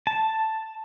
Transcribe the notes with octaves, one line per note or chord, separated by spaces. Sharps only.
A5